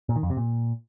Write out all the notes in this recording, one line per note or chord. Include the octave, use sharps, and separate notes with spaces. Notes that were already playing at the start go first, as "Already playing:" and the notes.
A#2
D#3
F2
C3
A#2